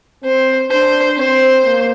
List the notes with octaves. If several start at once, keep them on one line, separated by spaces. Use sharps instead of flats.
C4 C5
D4 C5
C4 C5
A#3